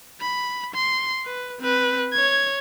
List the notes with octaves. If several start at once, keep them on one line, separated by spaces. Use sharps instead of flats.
B5
C6
B4
C4 B4
C#5 G#6